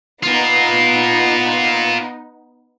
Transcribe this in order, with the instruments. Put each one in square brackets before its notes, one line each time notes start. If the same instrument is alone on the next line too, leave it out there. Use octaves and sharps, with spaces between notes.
[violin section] B3 D#4 [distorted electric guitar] F4 A#4